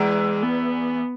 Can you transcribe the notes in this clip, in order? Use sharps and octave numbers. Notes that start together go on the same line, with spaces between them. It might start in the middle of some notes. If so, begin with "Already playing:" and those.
Already playing: E2 E3 G#3
B3